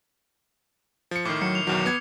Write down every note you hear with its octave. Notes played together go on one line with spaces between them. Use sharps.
F3 C#7
A2 D#3 D6 F6 C7
F#3 C#7
F7
B1 E2 D#3 F#3
B3 G#6